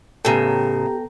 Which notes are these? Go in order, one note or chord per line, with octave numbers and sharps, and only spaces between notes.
A2 C#3 B3 G4 A4 G5 A#5